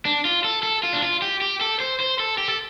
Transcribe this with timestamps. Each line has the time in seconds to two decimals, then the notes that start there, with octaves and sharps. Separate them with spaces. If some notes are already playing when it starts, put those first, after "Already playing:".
0.06 D4
0.25 F4
0.44 A4
0.63 A4
0.83 F4
0.93 D4
1.02 F4
1.22 G4
1.42 G4
1.61 A4
1.80 C5
2.00 C5
2.19 A4
2.38 G4
2.48 A4